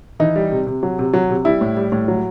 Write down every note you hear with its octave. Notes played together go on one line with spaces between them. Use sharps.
E3 D#4
G3
C3
C3
F#3
C3
F#3
C3
G3 E4
A2
G3
A2
F#3